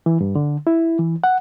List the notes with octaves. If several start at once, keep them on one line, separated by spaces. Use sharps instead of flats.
E3
G2
D3
E4
E3
F#5